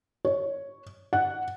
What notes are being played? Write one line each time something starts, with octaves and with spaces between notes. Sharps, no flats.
C#5
F#5